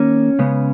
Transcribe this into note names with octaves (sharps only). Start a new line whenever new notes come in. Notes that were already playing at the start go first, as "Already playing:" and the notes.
Already playing: D#3 A#3 C#4
C#3 G#3 B3